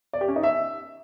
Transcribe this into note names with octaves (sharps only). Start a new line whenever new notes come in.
D5
G4
C#4
D#4
E5